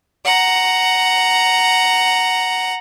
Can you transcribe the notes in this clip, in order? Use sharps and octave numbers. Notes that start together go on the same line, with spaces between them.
F#5 A#5